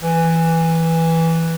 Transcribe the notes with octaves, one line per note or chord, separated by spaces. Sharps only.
E3